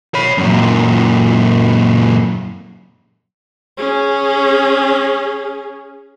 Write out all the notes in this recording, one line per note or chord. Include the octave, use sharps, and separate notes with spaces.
C#5 B5
F#2 A#2
C#4 G#4